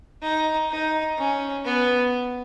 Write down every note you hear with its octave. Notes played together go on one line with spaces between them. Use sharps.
D#4
D#4
C#4
B3